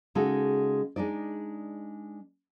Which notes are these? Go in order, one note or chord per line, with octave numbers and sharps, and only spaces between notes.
C#3 G#3 D#4 F#4 A4
G#3 D4 D#4 D5